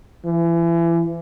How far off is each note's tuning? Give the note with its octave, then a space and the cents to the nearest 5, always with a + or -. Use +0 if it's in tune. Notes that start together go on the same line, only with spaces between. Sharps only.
E3 +30